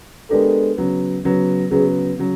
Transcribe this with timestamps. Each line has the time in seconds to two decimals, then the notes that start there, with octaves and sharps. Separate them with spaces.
0.30 G#3 B3 D4 G4 A4 A#4
0.76 C#3 F#3 B3
1.24 C#3 F#3 B3
1.71 C#3 F#3 B3 G#4
2.17 C#3 F#3